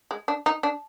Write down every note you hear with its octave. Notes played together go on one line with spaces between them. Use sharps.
G#3
D4
D#4
D4